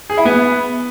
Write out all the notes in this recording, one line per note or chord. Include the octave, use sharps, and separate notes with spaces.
G#4
E4
B3